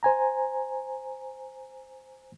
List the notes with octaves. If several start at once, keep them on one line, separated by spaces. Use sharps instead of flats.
C5 G#5 A#5